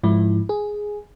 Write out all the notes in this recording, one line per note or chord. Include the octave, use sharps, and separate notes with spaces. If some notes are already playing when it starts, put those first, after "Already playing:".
G#2 F3 E4
G#4